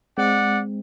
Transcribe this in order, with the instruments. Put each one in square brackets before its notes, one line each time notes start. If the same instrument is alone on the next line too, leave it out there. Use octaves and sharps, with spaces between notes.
[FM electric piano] G#3 C4 [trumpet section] D5 F#5